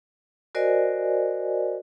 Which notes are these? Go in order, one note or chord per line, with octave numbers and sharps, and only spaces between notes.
F#4 A#4 C5 D5 D#5 G#5